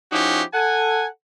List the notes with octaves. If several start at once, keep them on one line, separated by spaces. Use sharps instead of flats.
F3 C#4 D#4 E4 F#4 G4
A4 F#5 G#5